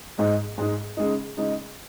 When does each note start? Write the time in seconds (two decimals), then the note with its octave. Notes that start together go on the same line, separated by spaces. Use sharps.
0.18 G#2 G#3 D#4
0.58 G#2 G#3 D#4
0.97 C#3 G#3 D#4
1.37 C#3 G#3 D#4